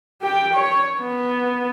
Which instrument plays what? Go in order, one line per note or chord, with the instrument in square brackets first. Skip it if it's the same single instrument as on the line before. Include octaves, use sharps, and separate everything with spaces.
[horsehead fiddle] G4 G5
C#5
B3